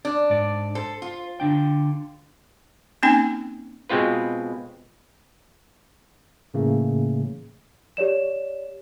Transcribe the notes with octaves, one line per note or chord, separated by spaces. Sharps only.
D4 D5
G#2 D5
A4 C5
F4
D3 D4 G5
A#3 C4 C#4 D#4 G5 G#5
B2 G#3 C4 F4 B4
A2 C#3 E3 A3 A#3
G4 C#5 D5 E7